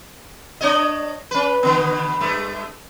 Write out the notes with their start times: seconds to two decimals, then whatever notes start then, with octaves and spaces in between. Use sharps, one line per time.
0.61 D4 C#5 D#5
1.31 C#4 B4
1.63 B2 D3 B3
2.21 G2 A3